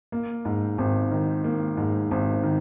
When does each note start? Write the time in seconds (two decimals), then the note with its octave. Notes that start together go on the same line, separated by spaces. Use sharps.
0.12 A#3
0.45 G#2
0.78 G#1
1.11 D#3
1.44 A#3
1.77 G#2
2.11 G#1
2.44 D#3